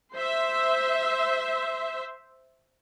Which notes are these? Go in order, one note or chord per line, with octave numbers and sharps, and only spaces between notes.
C5 E5